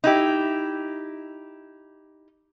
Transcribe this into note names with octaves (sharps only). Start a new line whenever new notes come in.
D#4 E4 G4